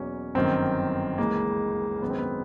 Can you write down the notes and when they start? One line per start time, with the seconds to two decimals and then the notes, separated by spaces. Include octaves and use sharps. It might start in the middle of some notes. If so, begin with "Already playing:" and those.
Already playing: E2 B2 F#3 A#3 C#4
0.35 G1 F#2 D#3 C4
1.18 C#2 C#3 E3 G#3 A#3
2.01 G#1 F#2 D#3 G#3 B3
2.10 C4
2.18 B3